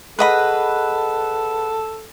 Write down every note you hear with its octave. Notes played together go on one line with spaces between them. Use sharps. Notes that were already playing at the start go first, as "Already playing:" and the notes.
G#4 A4 B4 D#5 F#5 B5 F#6